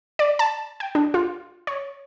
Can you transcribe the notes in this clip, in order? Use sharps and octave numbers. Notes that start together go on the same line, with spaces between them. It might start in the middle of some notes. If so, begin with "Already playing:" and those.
D5
A5
G5
D4
F4
C#5